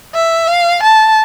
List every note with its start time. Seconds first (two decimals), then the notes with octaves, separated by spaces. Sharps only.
0.15 E5
0.48 F5
0.82 A5